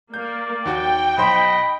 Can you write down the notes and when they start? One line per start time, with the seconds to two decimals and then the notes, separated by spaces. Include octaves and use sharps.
0.14 A#3 D5 G6
0.65 D#2 F#4 G5
1.18 B1 C5 D#5 B5 C6